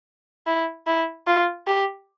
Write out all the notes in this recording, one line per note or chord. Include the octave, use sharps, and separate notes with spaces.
E4
E4
F4
G4